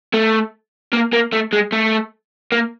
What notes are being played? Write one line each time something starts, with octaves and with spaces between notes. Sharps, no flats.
A3
A#3
A#3
A3
G#3
A3
A#3